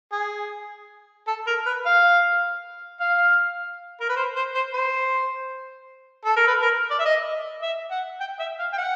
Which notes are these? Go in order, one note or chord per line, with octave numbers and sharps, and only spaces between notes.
G#4
A4
A#4
B4
F5
F5
A#4
B4
C5
C5
C5
C5
A4
A#4
B4
A#4
D5
E5
D#5
E5
F#5
G5
E5
F5
G5
F#5